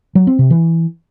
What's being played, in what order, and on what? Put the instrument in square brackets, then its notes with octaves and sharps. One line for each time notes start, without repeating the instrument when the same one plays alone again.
[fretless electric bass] F#3
C4
C3
E3